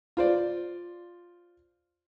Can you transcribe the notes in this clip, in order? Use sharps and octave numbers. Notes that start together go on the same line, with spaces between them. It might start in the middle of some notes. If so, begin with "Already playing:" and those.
F4 C5 D5